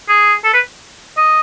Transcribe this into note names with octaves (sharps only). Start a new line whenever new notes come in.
G#4
A4
B4
D#5